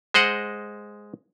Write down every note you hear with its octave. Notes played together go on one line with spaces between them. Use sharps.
G#3 C5 D#5 F#5